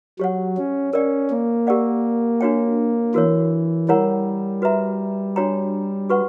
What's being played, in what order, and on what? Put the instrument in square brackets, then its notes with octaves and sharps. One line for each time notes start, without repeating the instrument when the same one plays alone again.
[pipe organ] F#3 [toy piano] G4 C#5 F#5
[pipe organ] C#4
[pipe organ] C#4 [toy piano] A#4 D5 G5
[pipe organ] A#3
[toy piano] G4 A#4 D5 F#5
D4 F#4 C#5 G5
[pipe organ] E3 [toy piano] F#4 A#4 C#5
[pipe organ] G3 [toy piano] E4 A#4 C#5 F#5 A#5
[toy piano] F#4 B4 E5 A#5
D4 F#4 C#5 G5 A#5
F#4 B4 F#5 C#6